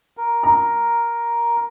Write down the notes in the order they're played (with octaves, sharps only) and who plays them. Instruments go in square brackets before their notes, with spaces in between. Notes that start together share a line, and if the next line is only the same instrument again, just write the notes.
[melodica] A#4
[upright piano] A#5